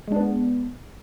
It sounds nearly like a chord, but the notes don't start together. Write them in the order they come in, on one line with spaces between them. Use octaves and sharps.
G#3 D4 B3